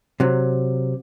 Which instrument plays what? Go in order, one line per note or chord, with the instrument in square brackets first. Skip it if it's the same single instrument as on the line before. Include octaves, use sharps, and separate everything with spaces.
[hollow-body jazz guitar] C3 F#3